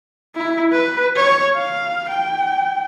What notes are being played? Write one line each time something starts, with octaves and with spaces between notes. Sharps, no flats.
E4
B4
C#5
F5
G5